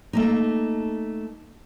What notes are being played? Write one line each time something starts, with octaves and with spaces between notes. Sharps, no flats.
A3 A#3 D#4